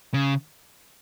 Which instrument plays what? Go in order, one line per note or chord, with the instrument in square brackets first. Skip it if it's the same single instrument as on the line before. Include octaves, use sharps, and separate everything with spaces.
[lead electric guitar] C#3